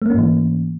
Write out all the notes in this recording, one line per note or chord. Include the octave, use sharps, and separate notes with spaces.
G#2 E3 A3 A#3 C#4